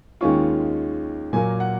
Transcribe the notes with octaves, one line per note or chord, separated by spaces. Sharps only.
D#2 D#3 G#3 C#4 F4 C#6
A#2 F#3 A#3 G#5
F#5